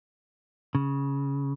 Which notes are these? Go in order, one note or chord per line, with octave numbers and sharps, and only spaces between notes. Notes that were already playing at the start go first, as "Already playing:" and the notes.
C#3